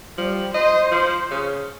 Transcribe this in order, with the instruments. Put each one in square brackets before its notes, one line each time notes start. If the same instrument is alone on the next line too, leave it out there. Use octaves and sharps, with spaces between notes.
[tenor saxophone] F3 [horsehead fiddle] G3
[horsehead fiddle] C5 [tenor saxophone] D#5
[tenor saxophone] F3
C#3